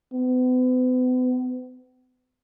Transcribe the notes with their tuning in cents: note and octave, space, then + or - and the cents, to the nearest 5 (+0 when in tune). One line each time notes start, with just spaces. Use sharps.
B3 +40